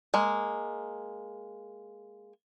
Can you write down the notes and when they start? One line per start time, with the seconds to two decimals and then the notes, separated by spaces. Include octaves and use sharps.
0.14 G#3 A#3